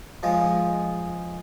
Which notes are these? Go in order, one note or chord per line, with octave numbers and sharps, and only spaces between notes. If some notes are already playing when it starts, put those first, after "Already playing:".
F3 G#3